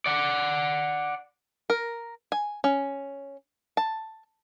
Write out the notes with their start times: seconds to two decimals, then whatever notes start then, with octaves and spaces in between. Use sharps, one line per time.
0.06 D5 F#5
1.70 A#4
2.32 G#5
2.64 C#4
3.77 A5